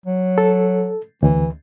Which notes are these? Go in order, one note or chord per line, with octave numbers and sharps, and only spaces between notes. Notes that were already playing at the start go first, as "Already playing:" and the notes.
F#3
A4
D2 E3